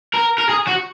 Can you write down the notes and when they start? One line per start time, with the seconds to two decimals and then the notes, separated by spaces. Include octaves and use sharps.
0.14 A#4
0.38 A#4
0.49 G#4
0.67 F#4